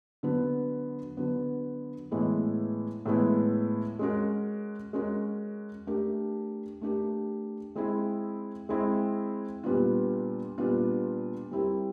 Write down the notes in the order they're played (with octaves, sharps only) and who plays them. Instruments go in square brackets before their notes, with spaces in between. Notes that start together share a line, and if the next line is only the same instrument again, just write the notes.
[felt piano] D3 F#3 B3
D3 F#3 B3
A2 E3 G#3 B3 E4
A2 E3 G#3 B3 E4
G#3 C#4 F#4 A#4
G#3 C#4 F#4 A#4
A3 D4 G4 A#4
A3 D4 G4 A#4
G#3 C4 E4 G#4
G#3 C4 E4 G#4
A#2 G3 B3 D4 F4
A#2 G3 B3 D4 F4
G3 C4 E4 G4 A#4